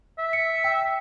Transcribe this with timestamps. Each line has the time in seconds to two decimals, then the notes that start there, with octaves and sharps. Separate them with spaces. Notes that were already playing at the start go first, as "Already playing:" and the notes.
0.18 E5
0.33 C#7
0.64 G5